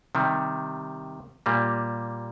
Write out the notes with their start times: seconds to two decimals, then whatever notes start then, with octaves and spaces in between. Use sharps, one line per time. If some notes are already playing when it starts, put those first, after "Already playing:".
0.15 C3 D#3 G3
1.46 A#2 G3 A#3